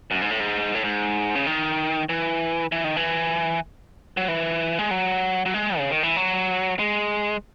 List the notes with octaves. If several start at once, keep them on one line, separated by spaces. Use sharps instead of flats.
F#2
G#2
A2
G#2
A2
G#2
C#3
D#3
E3
E3
D#3
E3
F#3
E3
G#3
F#3
F#3
G#3
C#3
D#3
E3
F#3
G#3